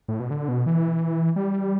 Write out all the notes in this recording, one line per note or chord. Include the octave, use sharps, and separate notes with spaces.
A2
B2
D3
B2
E3
G3